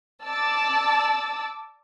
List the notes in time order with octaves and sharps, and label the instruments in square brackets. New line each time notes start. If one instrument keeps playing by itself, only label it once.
[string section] D5 A5 D6 E6 A6